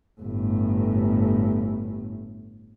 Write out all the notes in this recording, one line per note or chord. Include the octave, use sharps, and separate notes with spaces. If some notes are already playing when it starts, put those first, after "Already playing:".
G1 A2